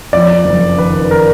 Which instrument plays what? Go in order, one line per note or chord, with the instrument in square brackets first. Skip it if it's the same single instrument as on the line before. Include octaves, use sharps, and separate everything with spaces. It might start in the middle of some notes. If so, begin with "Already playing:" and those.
[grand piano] F2 D5
F#1
D#3 B4
A#4